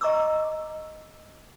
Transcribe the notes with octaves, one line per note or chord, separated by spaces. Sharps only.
D#5 A#5 C#6 D6 E6